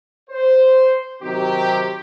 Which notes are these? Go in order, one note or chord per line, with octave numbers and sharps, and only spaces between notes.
C5
C3 D#3 F#3 C4 G4